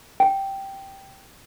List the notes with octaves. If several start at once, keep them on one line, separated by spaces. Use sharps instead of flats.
G5